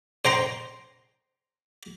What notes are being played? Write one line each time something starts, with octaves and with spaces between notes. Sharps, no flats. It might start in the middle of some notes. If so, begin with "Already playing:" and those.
C5 G5 A#5 C6